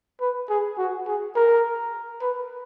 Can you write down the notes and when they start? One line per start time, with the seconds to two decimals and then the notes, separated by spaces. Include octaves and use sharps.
0.21 B4
0.49 G#4
0.78 F#4
1.07 G#4
1.36 A#4
2.21 B4